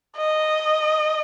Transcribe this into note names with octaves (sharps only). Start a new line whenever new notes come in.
D#5